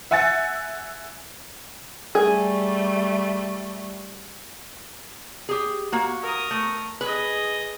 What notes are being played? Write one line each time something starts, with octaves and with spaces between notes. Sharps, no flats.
E5 F#5 G#5 E6 A6 C#7
G3 A3 G#4
G4 G#4
A#3 F#4
A#4 D#6
A3
G#4 B4 D#5